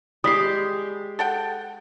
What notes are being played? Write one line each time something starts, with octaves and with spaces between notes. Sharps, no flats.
G3 G#3 G4 D#6 B6 C7
A4 F#5 G5